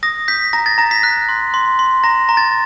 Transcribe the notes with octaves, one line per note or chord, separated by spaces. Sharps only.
D#6 A#6
G6 B6
A#5 A#6
A6
A#5 A#6
B6
F#6
C6
C6
C6
A#5 A#6
A#5
A6